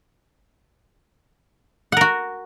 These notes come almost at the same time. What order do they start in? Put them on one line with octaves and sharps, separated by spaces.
F#5 A#4 F#4